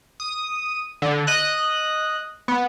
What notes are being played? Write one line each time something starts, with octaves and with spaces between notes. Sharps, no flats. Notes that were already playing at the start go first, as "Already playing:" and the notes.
D#6
D3
D#5 F#6
B3